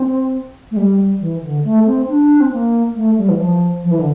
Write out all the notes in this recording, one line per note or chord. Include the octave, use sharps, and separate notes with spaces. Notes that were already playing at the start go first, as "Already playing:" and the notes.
Already playing: C4
A3
G3
E3
D3
A3
C4
D4
C4
A#3
A3
G3
E3
F3
F3
E3
D3